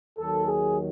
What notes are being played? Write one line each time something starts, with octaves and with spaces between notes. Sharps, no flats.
D#2 D#3 F#3 A4
G#4